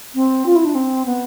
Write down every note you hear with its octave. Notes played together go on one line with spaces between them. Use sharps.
C4
F4
E4
D4
C4
B3